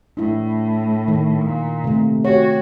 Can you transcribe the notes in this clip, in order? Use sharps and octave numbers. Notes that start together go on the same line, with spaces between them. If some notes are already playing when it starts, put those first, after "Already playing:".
A2 D4 E4
D#3
A#2
C3 A3
F#4 G4 C#5